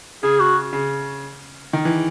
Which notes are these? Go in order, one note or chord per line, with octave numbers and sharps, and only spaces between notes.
C#3 G#4
F#4
C#3
D#3
E3